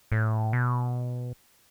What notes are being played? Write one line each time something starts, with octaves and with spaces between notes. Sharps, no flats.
A2
B2